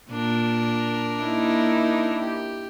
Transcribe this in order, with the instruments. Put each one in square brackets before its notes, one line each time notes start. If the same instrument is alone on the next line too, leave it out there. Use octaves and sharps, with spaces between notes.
[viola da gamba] A#2 [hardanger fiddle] D4 A#4
[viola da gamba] A#3 D#4 E4
[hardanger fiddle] G4